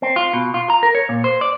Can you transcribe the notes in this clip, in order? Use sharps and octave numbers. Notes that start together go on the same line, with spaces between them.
C4
F4
B2
F4
A#5
A#4
C#5
A#2
C5
D5